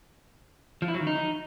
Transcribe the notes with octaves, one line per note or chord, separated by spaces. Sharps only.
F3
E4
F#3
D#3
D#4